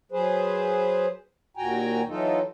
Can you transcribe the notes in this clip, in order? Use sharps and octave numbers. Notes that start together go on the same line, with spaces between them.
F#3 G#4 B4 C5
D#2 A#2 F#4 G5 G#5 A#5
E3 F#3 D#4 F4 A4